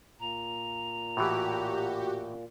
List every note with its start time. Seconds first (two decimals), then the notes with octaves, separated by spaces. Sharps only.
0.20 A#2 A#5
1.17 A2 E3 F#4 G4